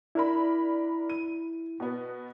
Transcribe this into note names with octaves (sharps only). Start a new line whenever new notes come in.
D4 E4 A#4 B5
D#7
B2 B3